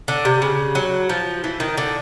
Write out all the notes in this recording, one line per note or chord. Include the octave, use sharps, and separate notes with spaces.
D3
C3
C#3
F#3
F3
E3
D#3
D3